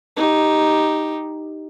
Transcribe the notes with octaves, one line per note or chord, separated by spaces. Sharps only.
D#4 G4